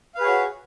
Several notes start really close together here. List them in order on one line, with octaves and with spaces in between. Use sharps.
F5 B4 G#4 C#5 F#4